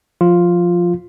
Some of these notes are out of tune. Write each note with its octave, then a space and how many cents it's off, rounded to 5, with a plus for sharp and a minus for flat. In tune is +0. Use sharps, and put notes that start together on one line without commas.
F3 +10 F4 +0